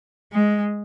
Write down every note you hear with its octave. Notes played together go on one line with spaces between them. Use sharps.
G#3